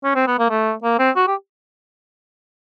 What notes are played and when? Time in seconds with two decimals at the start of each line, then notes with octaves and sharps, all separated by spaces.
0.04 C#4
0.15 C4
0.27 B3
0.38 A#3
0.50 A3
0.83 A#3
0.99 C4
1.16 F#4
1.27 G4